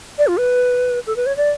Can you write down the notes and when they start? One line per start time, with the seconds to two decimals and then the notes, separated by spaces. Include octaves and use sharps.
0.18 D5
0.27 F4
0.37 B4
1.07 A4
1.16 B4
1.26 C#5
1.37 D5